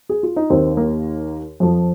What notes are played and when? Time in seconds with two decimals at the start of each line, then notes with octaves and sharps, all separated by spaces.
0.09 G#4
0.23 F4
0.36 D#4
0.50 D#2 D#3 C4
0.77 A#3
1.60 F2 F3